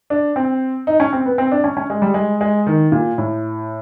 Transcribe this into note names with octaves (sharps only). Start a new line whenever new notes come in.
D4
C4
D#4
C#4
C4
B3
C4
D4
C#4
C#4
G#3
G3
G#3
G#3
D#3
A#2
A2